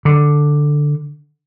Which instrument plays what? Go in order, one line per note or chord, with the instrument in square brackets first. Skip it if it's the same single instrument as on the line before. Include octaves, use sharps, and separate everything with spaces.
[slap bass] D3